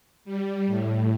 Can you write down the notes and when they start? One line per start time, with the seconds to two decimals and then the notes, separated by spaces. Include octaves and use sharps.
0.25 G3
0.67 A2